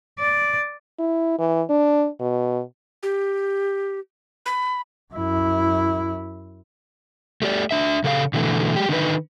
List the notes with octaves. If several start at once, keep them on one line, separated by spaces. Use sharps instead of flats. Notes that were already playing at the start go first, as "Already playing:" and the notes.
D5
E4
E3
D4
B2
G4
B5
F#2 E4
A3 G4 D5
D4 E5
C#3 A4 F5
B2 D3 E3 A3
G#3 G4
D3 D#3 D#4 B4